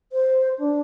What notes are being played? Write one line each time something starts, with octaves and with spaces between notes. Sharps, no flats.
C5
D4